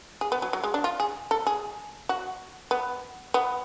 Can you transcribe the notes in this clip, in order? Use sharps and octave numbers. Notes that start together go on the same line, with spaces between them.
G#4
B3
F#3
F#3
G#3
D4
F4
G#4
A4
G#4
F#4
B3
B3